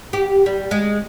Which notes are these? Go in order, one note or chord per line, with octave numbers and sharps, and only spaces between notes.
G4
G3
G#3